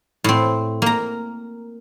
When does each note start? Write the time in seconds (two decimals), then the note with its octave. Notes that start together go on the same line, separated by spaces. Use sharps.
0.24 A2 C4
0.82 A#3 A#5